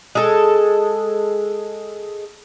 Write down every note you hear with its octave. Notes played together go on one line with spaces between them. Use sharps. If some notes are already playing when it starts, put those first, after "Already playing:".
G#3 A4